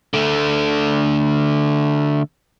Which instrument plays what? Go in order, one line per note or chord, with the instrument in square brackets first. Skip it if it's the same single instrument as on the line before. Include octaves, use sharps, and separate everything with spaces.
[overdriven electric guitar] D3 A3